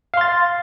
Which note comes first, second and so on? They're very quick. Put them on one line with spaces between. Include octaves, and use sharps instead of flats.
F5 C6 A6